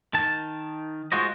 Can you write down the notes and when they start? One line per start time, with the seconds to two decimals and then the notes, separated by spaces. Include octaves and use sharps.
0.14 D#3 A5
1.12 G#3 F4 F#4 C5 D#5